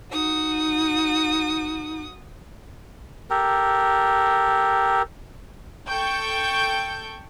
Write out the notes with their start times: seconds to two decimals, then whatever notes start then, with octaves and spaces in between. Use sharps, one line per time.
0.12 D#4 F#4 D#6
3.30 G4 A4 A#4
5.88 A4 G5 C#6 G6